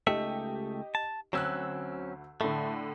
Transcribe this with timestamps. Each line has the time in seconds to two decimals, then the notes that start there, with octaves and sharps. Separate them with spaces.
0.07 C#2 A3 D#4 G4 E5
0.95 A5
1.33 D2 F#3 C4 C#4 E6 F#6
2.41 A2 D3 A3